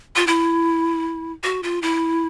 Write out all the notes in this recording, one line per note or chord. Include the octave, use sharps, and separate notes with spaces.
F4
E4
F#4
F4
E4